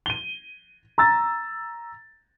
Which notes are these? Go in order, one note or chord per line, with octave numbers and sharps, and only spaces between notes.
D#7 G7
A#5 E6 A6